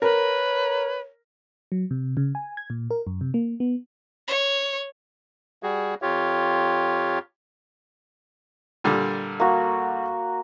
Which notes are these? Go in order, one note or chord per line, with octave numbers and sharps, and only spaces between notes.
A#4 B4 C#5
F#3
C3
C#3
G#5
G#6
A#2
A#4
F#2
C3
A#3
B3
C#5
G3 F#4 G#4
F2 F4 G4 C#5
A#2 D3 G3
A#3 F#4